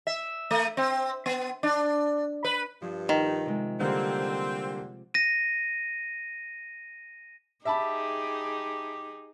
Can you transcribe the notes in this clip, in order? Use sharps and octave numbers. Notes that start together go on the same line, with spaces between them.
E5
A3
C4
B3
D4
B4
G2 F3
D#3
C3 G#3
D3 G3 A#3 C4
A#6 D#7
D#4 G4 G#4 E5 A5 B5